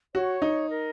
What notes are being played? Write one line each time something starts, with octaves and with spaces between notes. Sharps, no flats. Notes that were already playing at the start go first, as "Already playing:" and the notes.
F#4 C#5
D#4
A#4